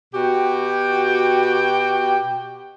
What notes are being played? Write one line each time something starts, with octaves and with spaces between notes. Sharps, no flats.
B2 F#4 G4 G5